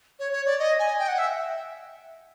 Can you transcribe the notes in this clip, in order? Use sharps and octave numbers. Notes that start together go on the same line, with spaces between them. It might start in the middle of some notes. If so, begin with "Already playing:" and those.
C#5
C#5
D5
D#5
G#5
G5
F#5
E5